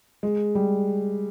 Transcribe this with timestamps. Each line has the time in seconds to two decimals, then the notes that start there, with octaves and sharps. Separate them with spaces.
0.23 G#3
0.55 G3